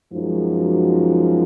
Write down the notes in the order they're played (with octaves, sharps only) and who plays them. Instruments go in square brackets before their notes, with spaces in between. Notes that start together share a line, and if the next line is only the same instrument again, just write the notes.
[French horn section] F#2 F3 G#3 D#4 F#4